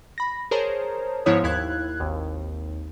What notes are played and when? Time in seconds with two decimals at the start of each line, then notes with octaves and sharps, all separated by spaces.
0.18 B5 A#6
0.51 G#4 A#4 C5 C#5 A5 A#5
1.26 G#2 F3 B3 E4 C#5 D#6
1.44 D#2 E4 F5 F#6 G#6
2.00 G#1 D#2